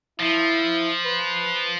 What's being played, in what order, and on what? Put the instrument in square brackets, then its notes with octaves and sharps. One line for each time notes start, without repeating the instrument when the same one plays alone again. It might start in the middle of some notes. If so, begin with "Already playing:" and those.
[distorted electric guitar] F3 [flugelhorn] E4
[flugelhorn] B4